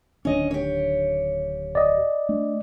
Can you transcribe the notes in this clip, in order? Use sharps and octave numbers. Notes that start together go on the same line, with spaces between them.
D1 D#3 C#4 D4 D#5
G4 C#5
D5 D#5
A3 D4